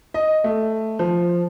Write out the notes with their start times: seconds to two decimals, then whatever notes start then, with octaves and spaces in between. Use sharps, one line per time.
0.14 D#5
0.44 A3
0.99 F3